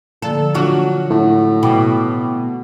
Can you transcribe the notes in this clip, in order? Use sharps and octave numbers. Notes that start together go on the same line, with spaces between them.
D3 F3 A#3 A4
F#3 D4 F4 F#4
A2
B2 G5 D6